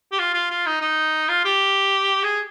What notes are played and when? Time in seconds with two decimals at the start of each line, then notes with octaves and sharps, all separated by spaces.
0.12 G4
0.19 F4
0.34 F4
0.50 F4
0.66 D#4
0.81 D#4
1.29 F4
1.45 G4
2.23 G#4